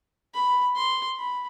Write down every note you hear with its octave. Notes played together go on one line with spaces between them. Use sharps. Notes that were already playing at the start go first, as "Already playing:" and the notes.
B5
C6
B5